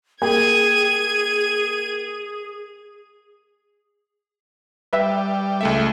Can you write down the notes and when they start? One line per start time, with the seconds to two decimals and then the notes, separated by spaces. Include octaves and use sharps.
0.22 A#3 G4 G#4 G5 G#6 D#7
4.93 G3 B4 E5
5.61 C#2 A3 E5